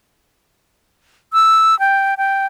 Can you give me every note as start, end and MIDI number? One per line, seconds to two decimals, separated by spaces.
1.33 1.78 88
1.79 2.15 79
2.18 2.46 79